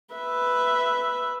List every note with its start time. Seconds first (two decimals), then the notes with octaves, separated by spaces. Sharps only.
0.14 B4 E5